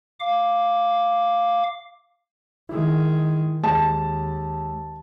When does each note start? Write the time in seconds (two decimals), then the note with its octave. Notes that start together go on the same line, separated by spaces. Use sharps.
0.20 F5 D6
2.69 D#3 G#3 E4
3.64 D#2 G#3 A5